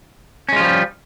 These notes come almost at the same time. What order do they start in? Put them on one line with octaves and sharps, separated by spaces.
C#4 G#3 F4 F3 G3